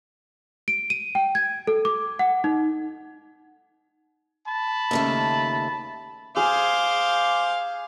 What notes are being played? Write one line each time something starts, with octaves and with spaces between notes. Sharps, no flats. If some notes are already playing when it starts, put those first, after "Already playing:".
D7
D#7
G5
G#6
A4
D6
F#5
D#4
A5 B5
D#2 C#3 A3
G#4 C5 F5 D6